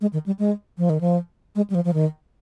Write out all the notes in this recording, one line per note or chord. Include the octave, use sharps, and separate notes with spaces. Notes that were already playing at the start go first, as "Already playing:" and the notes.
G#3
D#3
G3
G#3
F3
D#3
F3
G#3
G3
F3
F3
D#3